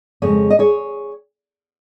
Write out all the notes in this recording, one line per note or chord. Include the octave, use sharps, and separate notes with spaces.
F2 C#3 G#3 G#4 C#5
D#5
G#4 C#5